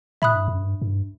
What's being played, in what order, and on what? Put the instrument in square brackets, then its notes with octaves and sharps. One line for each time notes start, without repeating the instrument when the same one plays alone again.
[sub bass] A2 [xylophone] E5 B5 D#6 F#6
[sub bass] G2
F#2
G2
G2